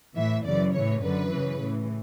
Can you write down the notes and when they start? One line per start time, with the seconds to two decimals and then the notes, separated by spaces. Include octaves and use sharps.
0.16 A2 E3 E5
0.45 F#2 C#3 E3 D5
0.73 A2 E3 C#5
1.02 F#2 D3 B4
1.31 F#2 C#3 E3
1.60 A2 E3